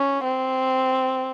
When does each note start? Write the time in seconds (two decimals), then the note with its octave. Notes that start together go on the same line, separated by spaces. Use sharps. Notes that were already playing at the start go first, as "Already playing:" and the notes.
Already playing: C#4
0.24 C4